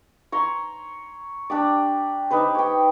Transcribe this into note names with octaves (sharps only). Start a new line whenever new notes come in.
C#5 A#5 C6
D4 G4 D5
D#4 G4 B4 C5
C#5 G5